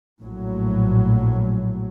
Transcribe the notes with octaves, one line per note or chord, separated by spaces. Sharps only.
A#1 A2 F#3